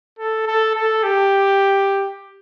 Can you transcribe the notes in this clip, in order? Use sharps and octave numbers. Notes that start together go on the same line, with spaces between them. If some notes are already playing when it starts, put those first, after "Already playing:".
A4
A4
A4
G4